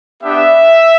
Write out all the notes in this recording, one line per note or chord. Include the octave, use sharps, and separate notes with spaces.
B3 D4 G4 E5